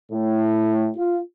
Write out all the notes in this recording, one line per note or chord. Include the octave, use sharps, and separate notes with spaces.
A2
F4